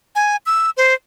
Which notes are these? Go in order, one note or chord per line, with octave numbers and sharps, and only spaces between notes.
G#5
E6
C5